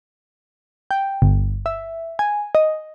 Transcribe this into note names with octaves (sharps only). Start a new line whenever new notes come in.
G5
G1
E5
G#5
D#5